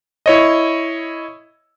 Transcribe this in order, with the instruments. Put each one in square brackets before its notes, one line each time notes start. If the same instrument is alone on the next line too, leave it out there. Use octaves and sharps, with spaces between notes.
[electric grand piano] E4 C#5 D#5